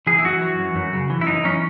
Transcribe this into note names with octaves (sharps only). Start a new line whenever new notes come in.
E3 G#4
E4
F#2 F#4
E3
F#2
F#2
C#3
E3
E4
F#2 D#4
E3 C#4